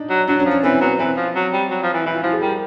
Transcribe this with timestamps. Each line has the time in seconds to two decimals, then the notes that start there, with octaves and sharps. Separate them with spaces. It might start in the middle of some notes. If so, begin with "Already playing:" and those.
Already playing: D4 D#4
0.10 F#3
0.28 F#3 D4
0.40 C#4
0.45 F3
0.51 C#4
0.63 E3 C4
0.81 F#3 B3
0.99 E3 C4
1.17 F3
1.35 F#3
1.53 G3
1.70 F#3
1.83 F3
1.94 E3
2.06 E3 E4
2.15 F4
2.23 F3 F#4
2.33 G#4
2.42 G3 A#4